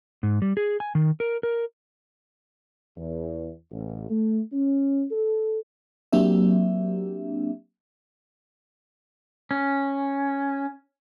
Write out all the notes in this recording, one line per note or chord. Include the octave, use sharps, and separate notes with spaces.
G#2
G3
G#4
G#5
D#3
A#4
A#4
E2
A1
A3
C#4
A4
F#3 A#3 C4 D4 G4 E5
C#4